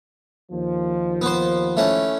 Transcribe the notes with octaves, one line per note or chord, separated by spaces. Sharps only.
D#2 F3
B3 C5
E3 A3 C#4